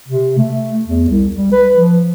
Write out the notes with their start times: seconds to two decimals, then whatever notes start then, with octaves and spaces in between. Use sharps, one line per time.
0.08 C3
0.38 A3
0.85 E2
1.09 C2
1.36 G3
1.53 B4
1.77 F3